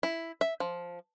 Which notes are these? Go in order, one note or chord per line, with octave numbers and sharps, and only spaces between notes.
E4
E5
F3